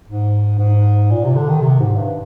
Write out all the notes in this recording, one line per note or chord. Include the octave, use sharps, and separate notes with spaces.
G#2
G#2
A#2
C3
D3
D#3
C3
G#2
G2